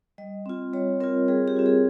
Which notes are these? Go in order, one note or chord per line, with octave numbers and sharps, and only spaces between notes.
G3 D#5
C4 F4
G3 C#5
C4 F4 A#4
G3 G#4
G4
C4 F4
G#4